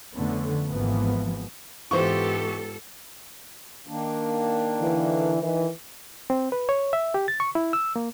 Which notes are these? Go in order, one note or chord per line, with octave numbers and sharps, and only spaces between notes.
F2 D3 A3 B3 C#4
G#1 G#2 E3 F3 A#3 B3
G#2 E3 B3 F4 G4 A4 C5 C#6
D#3 A#3 D4
D3 E3
D#3 E3
C4
B4
C#5
E5
G4
A6
C#6
E4
E6
A#3